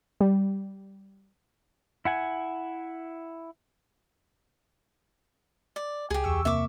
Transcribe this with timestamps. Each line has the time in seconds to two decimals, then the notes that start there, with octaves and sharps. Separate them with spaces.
0.21 G3
2.05 E4 F#5 G#5
5.76 D5
6.10 C#2 G4 G#4
6.24 E2 C#6 E6
6.45 C3 A#3 E5 D6